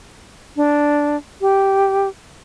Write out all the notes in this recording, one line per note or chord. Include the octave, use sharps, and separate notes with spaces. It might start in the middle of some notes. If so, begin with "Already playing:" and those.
D4
G4